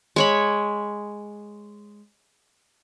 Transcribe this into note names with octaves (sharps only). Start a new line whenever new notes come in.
G#3 C#5 B5